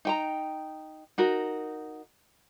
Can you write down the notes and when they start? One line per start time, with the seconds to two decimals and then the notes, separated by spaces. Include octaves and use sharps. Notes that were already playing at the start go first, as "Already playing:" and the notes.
0.05 D#4 G5 A#5
1.18 D#4 F#4 A#4